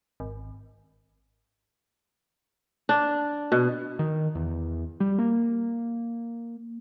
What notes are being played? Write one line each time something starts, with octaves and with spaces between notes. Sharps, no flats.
G#1
D4
B2
D#3
E2
G3
A#3